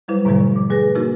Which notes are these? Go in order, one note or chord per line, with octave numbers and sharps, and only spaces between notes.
F#3 G3 E4 B4 C5
G#2 B2 D3 F3 G3 A3
D5
D6
A3 G#4 B4 A#6
A#3 D4 D#4 F#4 A#4